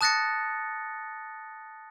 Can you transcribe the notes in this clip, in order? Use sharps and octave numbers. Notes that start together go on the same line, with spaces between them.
A5 D#6 F#6 A6 A#6 C#7